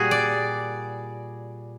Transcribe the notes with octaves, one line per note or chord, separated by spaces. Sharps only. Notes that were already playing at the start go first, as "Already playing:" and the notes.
Already playing: A#2 G3 F#4 G#4
D5